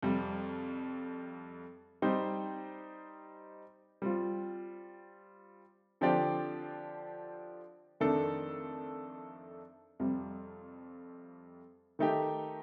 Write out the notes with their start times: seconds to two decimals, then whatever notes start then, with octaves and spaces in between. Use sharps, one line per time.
0.02 F2 C3 G3
2.02 G3 C4 D#4 G4 C5
4.02 G3 C4 F4
6.01 D3 F3 C4 G4 D5
8.00 F2 D#3 A3 D4 A4
10.00 F2 C3 G3
11.99 D#3 A3 D#4 G4